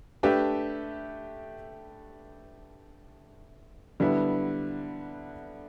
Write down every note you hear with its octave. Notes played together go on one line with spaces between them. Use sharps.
A3 D4 G4 B4 E5
D3 G3 B3 E4